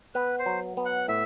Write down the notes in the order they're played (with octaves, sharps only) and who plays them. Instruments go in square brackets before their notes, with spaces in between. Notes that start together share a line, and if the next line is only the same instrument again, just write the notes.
[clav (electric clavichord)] B3 [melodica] B4
[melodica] C5
[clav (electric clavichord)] F#3
B3
[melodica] F#5
[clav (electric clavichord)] A2 [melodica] E5